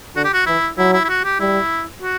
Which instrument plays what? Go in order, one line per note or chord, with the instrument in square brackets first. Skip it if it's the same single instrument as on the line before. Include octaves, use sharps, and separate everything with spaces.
[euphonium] D3 [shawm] F#4
[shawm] G4
F#4
[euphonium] E3 [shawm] E4
[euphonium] F#3 [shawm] E4
[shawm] E4
E4
F#4
G4
[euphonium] G3 [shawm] E4
[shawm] F#4